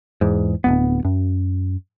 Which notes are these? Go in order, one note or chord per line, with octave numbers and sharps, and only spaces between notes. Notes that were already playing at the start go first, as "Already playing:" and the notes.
E2 G#2
D1 D#2 B3
F#2